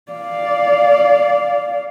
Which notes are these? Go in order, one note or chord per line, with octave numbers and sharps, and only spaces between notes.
D5 F5